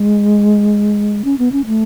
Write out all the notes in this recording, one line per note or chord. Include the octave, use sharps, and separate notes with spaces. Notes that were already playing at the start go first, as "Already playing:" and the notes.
Already playing: G#3
C#4
B3
C#4
A3